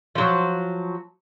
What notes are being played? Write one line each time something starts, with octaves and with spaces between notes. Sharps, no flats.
F3 F#3